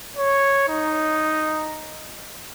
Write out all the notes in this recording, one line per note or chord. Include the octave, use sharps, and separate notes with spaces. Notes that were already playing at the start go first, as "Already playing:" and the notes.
C#5
D#4